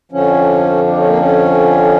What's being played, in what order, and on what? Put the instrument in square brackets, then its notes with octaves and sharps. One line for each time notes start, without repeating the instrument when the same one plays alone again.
[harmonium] F2 D3 F3 C#4
D4
C#4
A#3
C#4